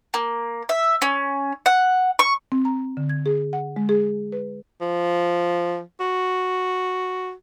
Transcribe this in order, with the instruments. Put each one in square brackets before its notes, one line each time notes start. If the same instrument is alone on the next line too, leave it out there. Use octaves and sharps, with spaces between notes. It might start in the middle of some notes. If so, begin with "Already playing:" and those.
[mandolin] A#3
E5
C#4
F#5
C#6
[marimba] C4
A#5
D3
G#6
G#4
F#5
G#3
G#4
B4
[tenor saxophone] F3
F#4